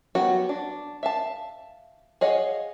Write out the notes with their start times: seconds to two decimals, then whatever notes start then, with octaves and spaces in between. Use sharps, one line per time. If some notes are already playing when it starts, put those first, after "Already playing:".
0.15 F#3 G3 B3 F#4
0.49 D4
1.03 E5 F5 A5
2.21 G#4 C#5 D#5 F5 F#5